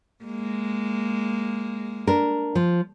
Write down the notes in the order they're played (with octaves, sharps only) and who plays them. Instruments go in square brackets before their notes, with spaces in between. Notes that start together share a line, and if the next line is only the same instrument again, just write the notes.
[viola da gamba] G#3 A#3
[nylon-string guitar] D4 A#4
F3